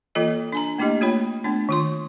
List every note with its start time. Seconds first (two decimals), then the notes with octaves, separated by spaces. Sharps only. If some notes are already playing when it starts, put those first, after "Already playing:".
0.15 E3 A#3 F4 A4 D#5
0.52 D4 G#5 A#5
0.78 A3 A#3 D4 E4 G4 D#5
1.01 A3 A#3 F4 C#5 B5
1.44 A3 B3 D4
1.69 D#3 F4 C6